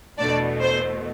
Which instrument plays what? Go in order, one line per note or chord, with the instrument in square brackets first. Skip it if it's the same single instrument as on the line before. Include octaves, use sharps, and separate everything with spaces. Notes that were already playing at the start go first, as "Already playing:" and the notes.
[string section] E2 B2 A3 D4 D5
C5